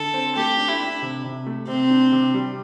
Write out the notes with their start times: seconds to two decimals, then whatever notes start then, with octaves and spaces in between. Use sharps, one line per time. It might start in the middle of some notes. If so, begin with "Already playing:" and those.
Already playing: D3 A4
0.14 C4
0.36 A3 G4
0.57 D4
0.69 E4
0.80 D4
1.02 C3
1.24 C3
1.46 A3
1.68 C3 C4
1.90 D4
2.12 C3
2.34 G3